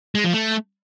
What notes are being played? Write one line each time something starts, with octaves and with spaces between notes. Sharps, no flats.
G#3
F3
A3